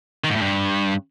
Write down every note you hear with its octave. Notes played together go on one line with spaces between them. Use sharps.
D#3
G#2
A2
G2